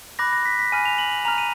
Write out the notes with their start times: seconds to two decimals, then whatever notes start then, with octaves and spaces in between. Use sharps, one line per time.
0.19 B5 D6 F#6 A#6
0.33 A#6
0.45 B6
0.59 B6
0.72 G#5 B5 F6 D#7
0.85 F7
0.98 F#7
1.11 F#7
1.25 A#5 F6 F7
1.38 D#7